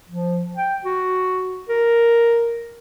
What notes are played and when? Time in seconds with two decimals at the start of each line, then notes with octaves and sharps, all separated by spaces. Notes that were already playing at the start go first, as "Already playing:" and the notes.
0.09 F3
0.56 G5
0.85 F#4
1.69 A#4